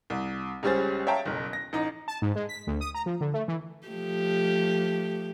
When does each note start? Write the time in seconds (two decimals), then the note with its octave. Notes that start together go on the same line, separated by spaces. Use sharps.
0.10 C2
0.63 C#2 G3 C#4 G#4 C5 A6
1.07 C#5 E5 F5 G5 A5 A#5
1.26 F#1 B1
1.53 A#6
1.73 A1 D#4
2.08 A5
2.22 G#2
2.36 G#3
2.49 B6
2.67 D2
2.81 D#6
2.95 A#5
3.06 F3
3.21 D3
3.34 A3
3.48 E3
3.87 F3 A3 G4